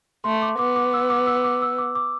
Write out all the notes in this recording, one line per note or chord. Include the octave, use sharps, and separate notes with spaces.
A3 C6
D6
B3 D6
D6
E6
D6
E6
D6
E6
D6
D6